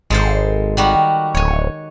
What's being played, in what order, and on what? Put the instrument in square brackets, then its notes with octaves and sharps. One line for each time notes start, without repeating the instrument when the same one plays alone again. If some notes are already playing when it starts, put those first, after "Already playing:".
[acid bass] G#1 [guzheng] G#3 A4 C5
[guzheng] D#3 G3 F#4
[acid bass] D1 [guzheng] C#5 G#5